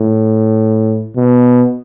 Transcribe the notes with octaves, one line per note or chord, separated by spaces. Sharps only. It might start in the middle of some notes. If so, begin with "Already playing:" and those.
Already playing: A2
B2